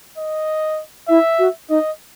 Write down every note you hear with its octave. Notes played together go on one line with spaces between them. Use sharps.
D#5
E4 E5
F#4
D#4 D#5